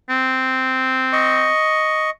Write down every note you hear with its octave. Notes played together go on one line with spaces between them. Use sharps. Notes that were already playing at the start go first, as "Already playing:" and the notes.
C4
D#5 C#6